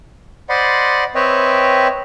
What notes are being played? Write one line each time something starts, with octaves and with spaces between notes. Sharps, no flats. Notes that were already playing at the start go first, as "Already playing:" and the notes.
C5 D5 D#5 F#5 B5 C6
C4 B4 C#5 D#5 E5 G5